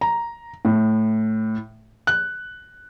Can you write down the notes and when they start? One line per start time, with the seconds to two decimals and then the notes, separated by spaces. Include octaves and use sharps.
0.01 A#5
0.65 A2
2.07 F#6